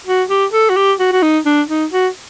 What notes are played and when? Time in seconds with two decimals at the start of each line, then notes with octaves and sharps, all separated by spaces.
0.07 F#4
0.29 G4
0.52 A4
0.69 F#4
0.76 G4
1.00 F#4
1.12 F#4
1.22 D#4
1.45 D4
1.69 D#4
1.92 F#4